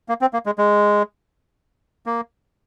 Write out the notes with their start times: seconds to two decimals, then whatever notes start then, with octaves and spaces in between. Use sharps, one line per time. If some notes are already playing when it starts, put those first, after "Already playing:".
0.09 A#3
0.21 C4
0.33 A#3
0.46 G#3
0.58 G#3
2.06 A#3